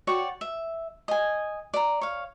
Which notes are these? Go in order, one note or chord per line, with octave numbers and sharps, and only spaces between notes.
F#4 C#5 D5 G5
E5
D#5 G#5
D5 A#5
C#5 F5